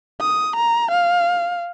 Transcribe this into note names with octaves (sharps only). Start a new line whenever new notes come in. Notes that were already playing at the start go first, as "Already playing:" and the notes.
D#6
A#5
F5